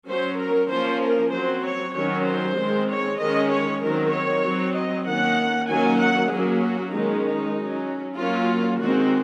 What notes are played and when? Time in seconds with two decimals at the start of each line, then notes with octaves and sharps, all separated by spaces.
0.09 F#3 C#4 C5
0.40 A#4
0.71 F3 A#3 C#4 C5
1.03 A#4
1.33 F#3 C4 C5
1.65 C#5
1.95 D#3 F#3 C#4 C#5
2.27 C5
2.58 D#3 G#3 C4
2.90 C#5
3.20 D#3 G#3 C#4 D#5
3.51 C#5
3.82 D#3 F#3 C4 A#4
4.13 C#5
4.44 F#3 C4
4.76 D#5
5.07 D#3 A#3 C#4 F#5
5.70 D#3 F#3 A#3 C#4 G#5
6.00 F#5
6.31 F#3 A#3 C#4 G#4
6.62 F#4
6.93 D#3 G#3 C#4 D#4
7.25 D#4
7.55 F#3 C#4
8.18 F#3 A#3 C#4 F4
8.80 D#3 G#3 C4 F#4